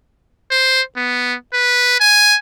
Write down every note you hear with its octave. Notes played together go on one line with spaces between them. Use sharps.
C5
B3
B4
G#5